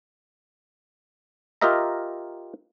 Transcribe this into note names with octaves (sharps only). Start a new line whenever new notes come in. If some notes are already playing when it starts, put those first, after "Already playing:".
F4 G4 A#4 D#5 E5 A#5